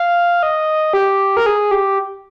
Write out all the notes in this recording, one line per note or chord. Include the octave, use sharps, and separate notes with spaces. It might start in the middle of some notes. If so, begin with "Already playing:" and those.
Already playing: F5
D#5
G4
A#4
G#4
G4